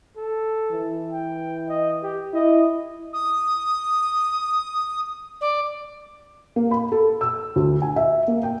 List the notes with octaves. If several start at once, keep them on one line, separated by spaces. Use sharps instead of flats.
A4
E3
G5
D#5
G4
E4 D#5
D#6
D5
A#3
B5
A4
E6
D2
G#5
E5
A#3
G5